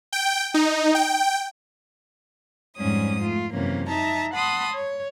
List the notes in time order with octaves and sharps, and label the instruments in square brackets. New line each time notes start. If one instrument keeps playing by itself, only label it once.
[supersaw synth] G5
D#4
G5
[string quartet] F2 G#2 G3 C#4 D#6
A3 F4
F#2 C3 E3 A#3 C#4
D#4 E5 A5 A#5
F#5 A5 B5 C6 D#6
C#5